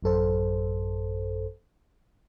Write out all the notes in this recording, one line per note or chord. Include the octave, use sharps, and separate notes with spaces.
A1 F#2 A4 C5